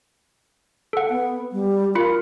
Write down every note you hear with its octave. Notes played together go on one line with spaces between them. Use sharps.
A4 F#5
B3
G3
F4 A#4 B5 C#7